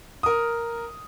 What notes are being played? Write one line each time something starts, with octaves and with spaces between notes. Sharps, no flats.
A#4 D#6